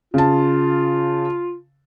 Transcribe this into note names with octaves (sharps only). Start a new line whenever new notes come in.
C#3 F4 A5